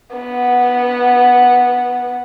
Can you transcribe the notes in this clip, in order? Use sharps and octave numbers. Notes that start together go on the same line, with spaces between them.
B3 F#5